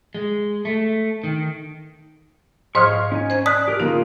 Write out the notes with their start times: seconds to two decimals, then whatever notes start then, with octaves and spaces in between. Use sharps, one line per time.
0.15 G#3
0.65 A3
1.24 D#3
2.75 G#2 C5 C#5 D#5 F5 C#6 D#6 F6
3.12 C#4 D#4 G#5
3.30 C5 G#6
3.46 D5 A5 D#6 F#6 B6
3.68 G4 A#4
3.80 C#3 A#3 D#4 F4